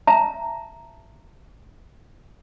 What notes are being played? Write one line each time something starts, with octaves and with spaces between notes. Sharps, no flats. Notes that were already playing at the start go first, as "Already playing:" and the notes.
E5 A5 A#5